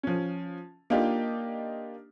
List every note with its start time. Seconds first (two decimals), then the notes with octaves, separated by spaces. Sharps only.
0.03 F3 C#4
0.90 A#3 D4 D#4 F4 G4